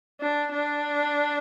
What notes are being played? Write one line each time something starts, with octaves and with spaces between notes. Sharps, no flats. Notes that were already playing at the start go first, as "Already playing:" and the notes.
D4
D4